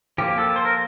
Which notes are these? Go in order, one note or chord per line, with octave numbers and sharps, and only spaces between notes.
F3 A#3 G4
A4
C5
A#4